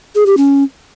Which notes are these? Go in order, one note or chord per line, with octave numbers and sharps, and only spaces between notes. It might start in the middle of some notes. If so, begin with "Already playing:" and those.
G#4
G4
C#4